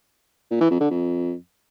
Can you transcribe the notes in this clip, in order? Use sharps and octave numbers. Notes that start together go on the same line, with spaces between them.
A#2
E3
F2
D3
F2